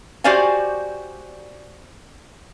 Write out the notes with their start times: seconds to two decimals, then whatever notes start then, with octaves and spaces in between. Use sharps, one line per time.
0.24 F#4 G4 C5 D5 F5 G#5